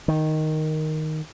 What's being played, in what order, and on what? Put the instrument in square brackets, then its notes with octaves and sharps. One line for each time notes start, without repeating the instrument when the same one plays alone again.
[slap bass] D#3